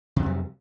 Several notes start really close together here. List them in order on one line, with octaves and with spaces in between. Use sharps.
C3 F#3 F2 G3